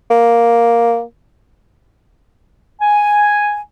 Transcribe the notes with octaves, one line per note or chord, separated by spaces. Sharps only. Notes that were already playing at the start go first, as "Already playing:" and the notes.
A#3
G#5